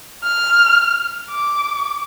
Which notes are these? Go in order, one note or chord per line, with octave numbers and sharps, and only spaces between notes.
F6
D6